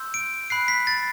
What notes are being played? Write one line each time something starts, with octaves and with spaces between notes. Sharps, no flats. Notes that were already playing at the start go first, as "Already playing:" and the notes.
Already playing: C6 E6 G6
D7
B5 F#6 C7
B6
A6